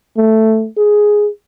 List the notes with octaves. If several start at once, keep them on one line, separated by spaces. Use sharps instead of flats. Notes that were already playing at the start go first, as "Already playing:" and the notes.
A3
G#4